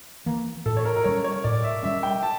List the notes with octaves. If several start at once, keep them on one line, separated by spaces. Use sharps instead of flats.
E3 A#3
A2 A4
C#5
A#4
A#4
G3 C#4 C#5
C#5
A2 D5
E5
G3 C#4 E5
G5
A5